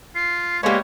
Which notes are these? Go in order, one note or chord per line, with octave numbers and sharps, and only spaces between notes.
F4 C7
G3 G#3 A#3 B3 C#5 C6